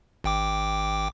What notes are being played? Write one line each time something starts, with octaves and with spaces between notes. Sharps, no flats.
G#1 G5 D6